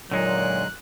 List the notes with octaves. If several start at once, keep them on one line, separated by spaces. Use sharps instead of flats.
A#2 D3 F#3 G#3 D#4 F#6